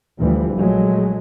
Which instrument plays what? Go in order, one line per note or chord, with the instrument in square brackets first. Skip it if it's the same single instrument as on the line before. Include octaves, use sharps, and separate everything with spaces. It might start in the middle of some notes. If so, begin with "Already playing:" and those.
[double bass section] D2 E3 F3 G3
A#1 F#3 G#3 A3